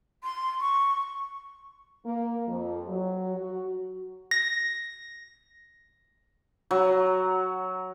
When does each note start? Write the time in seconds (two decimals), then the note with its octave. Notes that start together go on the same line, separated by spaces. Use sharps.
0.24 C6
0.60 C#6
2.05 A#3
2.47 F2
2.87 F#3
3.37 F#4
4.31 A#6
6.71 F#3